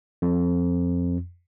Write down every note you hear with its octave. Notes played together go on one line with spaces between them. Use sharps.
F2